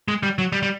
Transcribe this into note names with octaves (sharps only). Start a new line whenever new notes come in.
G#3
G3
F#3
G3
G3